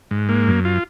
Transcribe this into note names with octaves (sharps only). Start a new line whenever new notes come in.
G#2
A#3
F#2
F4